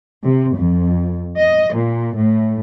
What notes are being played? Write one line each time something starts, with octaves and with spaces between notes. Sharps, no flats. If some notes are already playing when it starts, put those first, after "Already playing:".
C3
F2
D#5
A#2
A2